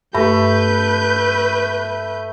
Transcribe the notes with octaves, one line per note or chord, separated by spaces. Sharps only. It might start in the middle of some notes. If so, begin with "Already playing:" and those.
G2 A3 B4 G6